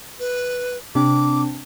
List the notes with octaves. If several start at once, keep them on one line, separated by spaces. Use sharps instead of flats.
B4
C3 C4 D4 D6